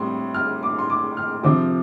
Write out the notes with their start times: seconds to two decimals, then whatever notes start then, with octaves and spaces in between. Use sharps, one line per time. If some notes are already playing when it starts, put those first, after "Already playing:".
Already playing: A2 G3 C4 C6
0.34 F6
0.63 D6
0.79 C6
0.90 D6
1.17 F6
1.43 C3 F3 C4 D6